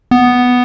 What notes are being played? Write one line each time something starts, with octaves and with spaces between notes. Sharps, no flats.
B3